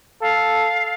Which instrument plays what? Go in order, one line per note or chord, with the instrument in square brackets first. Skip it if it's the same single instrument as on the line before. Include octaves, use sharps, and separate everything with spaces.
[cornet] A4 [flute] F5